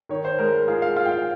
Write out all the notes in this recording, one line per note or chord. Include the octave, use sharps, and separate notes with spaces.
D#3 C#5
C5
G#3 A#4
A#4
F4 G#4
F5
F4 F5
G5
F5